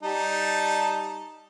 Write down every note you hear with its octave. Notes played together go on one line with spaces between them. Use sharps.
G3 D#4 A5